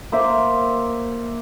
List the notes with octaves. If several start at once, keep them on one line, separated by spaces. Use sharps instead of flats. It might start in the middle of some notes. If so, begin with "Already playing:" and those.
A#3 C5 E5